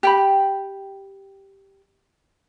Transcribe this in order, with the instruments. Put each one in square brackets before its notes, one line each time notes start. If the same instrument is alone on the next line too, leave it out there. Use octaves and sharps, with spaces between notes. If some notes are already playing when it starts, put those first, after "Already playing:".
[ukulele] G4 G5 B5